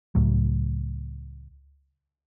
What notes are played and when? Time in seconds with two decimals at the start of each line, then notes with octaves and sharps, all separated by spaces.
0.15 C#2 A2 F#3